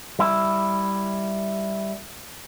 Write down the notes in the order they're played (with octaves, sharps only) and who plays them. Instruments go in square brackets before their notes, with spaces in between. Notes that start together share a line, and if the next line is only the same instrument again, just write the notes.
[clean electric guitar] G3 E4